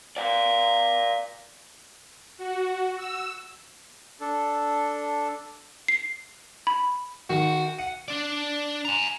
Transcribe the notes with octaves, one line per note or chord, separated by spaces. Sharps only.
D5 F5
F#4
E6
D4 A4
C7
B5
D#3 F#4
F#5 D#7
D4 D5
G#5 A#5